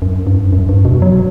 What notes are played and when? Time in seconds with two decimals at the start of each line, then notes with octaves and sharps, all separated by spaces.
0.02 F#2
0.27 G2
0.52 F#2
0.69 G2
0.85 B2
1.02 F#3